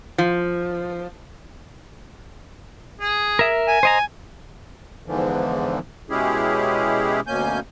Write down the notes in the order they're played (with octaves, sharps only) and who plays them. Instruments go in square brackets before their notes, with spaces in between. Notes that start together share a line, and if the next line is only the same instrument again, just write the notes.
[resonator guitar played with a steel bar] F3
[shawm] G#4
[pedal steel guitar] A#4 E5
[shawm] G#5
[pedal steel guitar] C5 D#5 A#5
[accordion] E2 G#2 D3 E3 F3
B2 G#3 C#4 E4 G4 G#4
D2 B2 A#3 C#4 G#5 G6